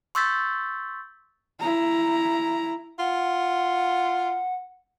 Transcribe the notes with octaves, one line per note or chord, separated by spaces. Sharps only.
C6 C#6 E6 G6 A6 B6
E4 A#5
F4 F#5